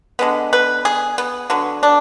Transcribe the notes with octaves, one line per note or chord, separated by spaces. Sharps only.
D3 G#3 B3
B4
G#4
B3
D3 F#3 B3
D4